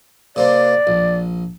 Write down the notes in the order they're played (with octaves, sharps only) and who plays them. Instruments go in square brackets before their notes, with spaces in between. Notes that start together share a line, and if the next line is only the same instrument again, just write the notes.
[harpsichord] C3 A#3 C4 [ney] D5
[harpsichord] A#1